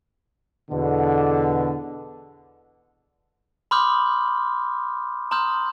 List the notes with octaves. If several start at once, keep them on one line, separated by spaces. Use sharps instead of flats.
E2 B2 D3
B5 C6 D6 D#6 F6 G6
A#5 C6 D#6 F6 G6